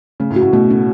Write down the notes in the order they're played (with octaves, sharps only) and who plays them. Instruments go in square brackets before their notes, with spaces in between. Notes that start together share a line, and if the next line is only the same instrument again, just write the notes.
[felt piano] C#3 [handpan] A3
[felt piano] A2
[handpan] F#4
[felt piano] A2
[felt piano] B2 [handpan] A3
[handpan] C#4